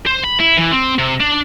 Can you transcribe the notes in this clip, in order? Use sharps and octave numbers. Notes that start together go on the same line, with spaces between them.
C5
B5
E4
E3
C4
C3
D4